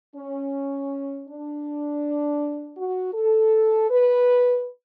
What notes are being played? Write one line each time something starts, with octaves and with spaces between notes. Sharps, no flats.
C#4
D4
F#4
A4
B4